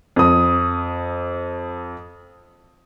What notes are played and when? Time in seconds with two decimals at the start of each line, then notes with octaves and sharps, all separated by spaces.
0.16 F2 D#6